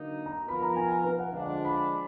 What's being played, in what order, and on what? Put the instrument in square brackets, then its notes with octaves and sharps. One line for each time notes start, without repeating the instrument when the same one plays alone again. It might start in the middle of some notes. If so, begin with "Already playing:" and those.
Already playing: [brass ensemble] D3 F#3 A#3 D#4
[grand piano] A#5
[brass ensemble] F3 B3 F4 A#4 [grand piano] B5
[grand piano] A#5
G#5
B4
F#5
[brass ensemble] D3 F3 G#3 D4 [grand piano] F5
[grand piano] F#5
B5